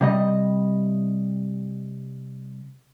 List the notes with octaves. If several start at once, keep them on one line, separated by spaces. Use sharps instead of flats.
C3 G3 D#5